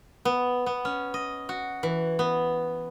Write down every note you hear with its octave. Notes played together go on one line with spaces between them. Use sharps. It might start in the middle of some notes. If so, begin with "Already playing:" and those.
B3
B3
C#4
D#5
F#4
E3
B3